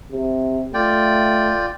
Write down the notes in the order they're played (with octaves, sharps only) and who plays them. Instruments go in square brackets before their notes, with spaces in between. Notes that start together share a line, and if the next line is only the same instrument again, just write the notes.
[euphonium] C3
[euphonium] A3 [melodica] F4 D5 G5